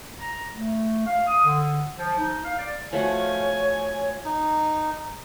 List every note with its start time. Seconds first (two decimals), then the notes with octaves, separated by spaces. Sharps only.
0.20 A#5
0.55 A3
1.06 F5
1.27 D#6
1.45 D3
1.98 F3
2.18 D#4
2.43 F5
2.58 D5
2.93 F3 A3 F#4 C#5 G#5
4.25 D#4